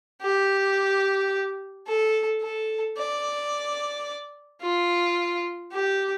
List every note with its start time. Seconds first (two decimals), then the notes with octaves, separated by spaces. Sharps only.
0.22 G4
1.87 A4
2.41 A4
2.97 D5
4.61 F4
5.72 G4